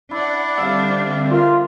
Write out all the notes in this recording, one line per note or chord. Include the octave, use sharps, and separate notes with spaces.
D4 E4 D5 F#5
D3 G3 C4 E5 F5
F4 A#4